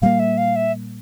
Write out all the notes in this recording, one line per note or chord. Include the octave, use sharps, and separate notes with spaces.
A#2 G3 A#3 F5
E5
F5
E5